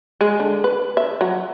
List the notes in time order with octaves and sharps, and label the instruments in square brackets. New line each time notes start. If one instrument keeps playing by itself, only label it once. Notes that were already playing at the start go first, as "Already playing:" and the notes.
[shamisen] G#3
D3
B4
E5
F#3